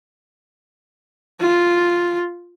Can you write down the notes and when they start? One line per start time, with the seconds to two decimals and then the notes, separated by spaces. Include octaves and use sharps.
1.40 F4